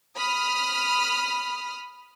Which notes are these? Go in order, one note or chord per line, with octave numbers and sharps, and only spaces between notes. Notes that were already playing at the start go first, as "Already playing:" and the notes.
B5 D#6 F6